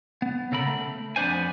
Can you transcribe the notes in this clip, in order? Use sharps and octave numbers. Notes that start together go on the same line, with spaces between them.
B3
C#3 A4 A#4 B5
A3
F2 B3 D4 C5 G#5